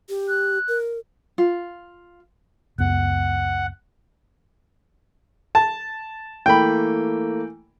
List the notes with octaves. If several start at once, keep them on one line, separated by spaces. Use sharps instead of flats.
G4
F#6
A#4
F4
C#2 F#2 B3 F#5
A5
E3 A3 A#3 G5 B5